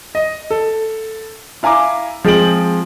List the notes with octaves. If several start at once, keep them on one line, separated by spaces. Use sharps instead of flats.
D#5
A4
E4 F5 G#5 A#5 D6
F3 G#3 C4 G#4 D7 F#7